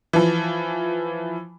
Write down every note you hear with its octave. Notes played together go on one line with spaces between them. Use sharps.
E3 F3